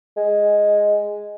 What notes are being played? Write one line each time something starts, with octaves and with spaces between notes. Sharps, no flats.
G#3